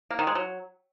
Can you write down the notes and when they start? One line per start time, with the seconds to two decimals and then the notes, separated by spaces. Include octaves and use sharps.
0.10 A#3
0.19 D#3
0.27 G#3
0.35 F#3